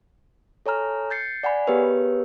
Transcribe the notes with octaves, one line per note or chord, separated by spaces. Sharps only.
A4 C#5 G#5 A#5 F6
G6 A6 C7 C#7
D5 F#5 G#5 B5
B3 G4 G#4 A#4 B4 C#5